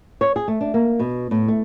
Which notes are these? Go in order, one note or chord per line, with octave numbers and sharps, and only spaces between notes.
C#5
G#4
A3
D4
A#3
B2
A2
A3